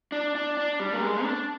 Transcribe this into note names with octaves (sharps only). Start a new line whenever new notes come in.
D4
D4
D4
G3
A#3
G#3
D4